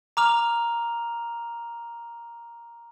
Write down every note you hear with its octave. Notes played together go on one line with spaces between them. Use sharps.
A#5 D6 F6 F7